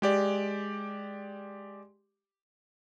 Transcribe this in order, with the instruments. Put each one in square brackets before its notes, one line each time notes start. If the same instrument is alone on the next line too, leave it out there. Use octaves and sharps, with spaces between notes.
[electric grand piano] G#3 G4 D5